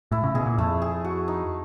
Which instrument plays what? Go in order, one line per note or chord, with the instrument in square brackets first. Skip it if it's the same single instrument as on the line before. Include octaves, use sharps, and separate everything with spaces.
[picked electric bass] A2 [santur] E4
[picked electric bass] C#3
[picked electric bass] B2 [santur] G#4
[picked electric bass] A#2
[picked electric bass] F2 [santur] A3
[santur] G#4
F#4
D#4